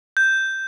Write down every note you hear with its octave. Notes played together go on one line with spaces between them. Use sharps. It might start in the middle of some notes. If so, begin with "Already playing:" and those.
G6